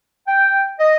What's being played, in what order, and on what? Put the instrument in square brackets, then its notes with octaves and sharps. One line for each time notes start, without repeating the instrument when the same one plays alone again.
[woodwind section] G5
D#5